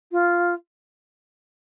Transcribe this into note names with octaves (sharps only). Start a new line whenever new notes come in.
F4